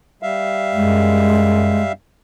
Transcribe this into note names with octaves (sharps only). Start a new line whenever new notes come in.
G3 E5 F5
F#2 G#3